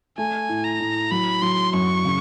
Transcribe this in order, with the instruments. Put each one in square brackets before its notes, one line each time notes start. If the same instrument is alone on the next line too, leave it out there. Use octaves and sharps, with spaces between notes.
[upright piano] A3 [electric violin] G#5
[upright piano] A2
[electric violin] A#5
[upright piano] A2
[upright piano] F#3 [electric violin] B5
[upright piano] F#3 [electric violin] C6
[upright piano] F#2 [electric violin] C#6
[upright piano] C#3